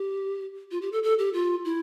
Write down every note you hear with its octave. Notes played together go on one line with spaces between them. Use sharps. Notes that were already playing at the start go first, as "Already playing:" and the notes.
Already playing: G4
F4
G4
A4
A4
G4
F4
E4